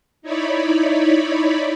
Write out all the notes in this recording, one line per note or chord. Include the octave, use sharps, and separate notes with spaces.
D#4 E4 C#5 D5 B5